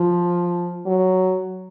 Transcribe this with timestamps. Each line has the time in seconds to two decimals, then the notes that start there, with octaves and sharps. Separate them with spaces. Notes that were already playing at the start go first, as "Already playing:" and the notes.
Already playing: F3
0.86 F#3